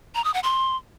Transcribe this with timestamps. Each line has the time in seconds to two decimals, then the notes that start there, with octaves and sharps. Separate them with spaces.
0.15 A#5
0.24 D#6
0.34 F#5
0.43 C6